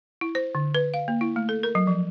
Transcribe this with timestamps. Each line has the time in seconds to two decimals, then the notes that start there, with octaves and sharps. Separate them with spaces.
0.21 E4
0.35 C5
0.55 D3
0.75 B4
0.94 F5
1.08 A#3
1.21 E4
1.36 A3
1.49 A4
1.63 A#4
1.75 F#3
1.87 F3